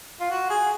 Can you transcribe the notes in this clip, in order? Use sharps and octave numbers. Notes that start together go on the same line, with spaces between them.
F4
F#4
G#4